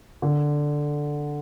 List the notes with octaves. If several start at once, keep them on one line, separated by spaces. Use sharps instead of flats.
D3